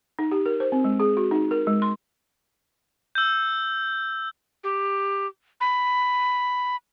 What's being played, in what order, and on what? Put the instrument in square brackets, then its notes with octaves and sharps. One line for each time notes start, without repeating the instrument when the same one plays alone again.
[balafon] D#4
G4
A#4
C5
C4
G#3
G#4
F#4
D#4
A#4
G#3
C6
[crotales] E6 G6
[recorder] G4
B5